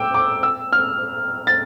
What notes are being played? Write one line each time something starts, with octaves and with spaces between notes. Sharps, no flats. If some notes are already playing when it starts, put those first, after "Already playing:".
Already playing: G5 D6 E6
D6
E6
F6
A6